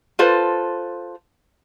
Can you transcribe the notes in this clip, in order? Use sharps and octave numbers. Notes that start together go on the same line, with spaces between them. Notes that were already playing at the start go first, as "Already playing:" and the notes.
F4 A4 B4 C5